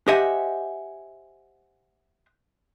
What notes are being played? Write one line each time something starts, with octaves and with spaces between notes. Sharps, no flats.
G4 C5 D#5 E5 F#5 G#5